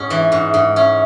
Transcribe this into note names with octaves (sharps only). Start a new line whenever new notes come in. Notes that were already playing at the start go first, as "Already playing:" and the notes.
Already playing: G#2 C#4
E3 E5
G#2
G#2
C#4